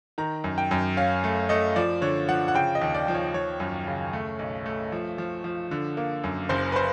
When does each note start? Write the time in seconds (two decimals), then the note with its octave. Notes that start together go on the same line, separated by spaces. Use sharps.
0.18 D#3 A#5
0.44 F#2
0.58 G5
0.71 F#2
0.97 C#4 F5
1.24 A3
1.49 A3 D#5
1.76 F3 D5
2.02 D3 C#5
2.29 F3 F#5
2.48 F#5
2.54 C#3 G5
2.75 D#5
2.81 D#2
2.94 D5
3.08 F3
3.14 C#5
3.34 F3 C#5
3.60 F#2
3.87 C#3
4.13 A3
4.39 B1
4.66 A3
4.92 F3
5.18 F3
5.44 F3
5.71 D3
5.97 A#3
6.24 F#2
6.49 F#1 C5
6.72 B4
6.76 C5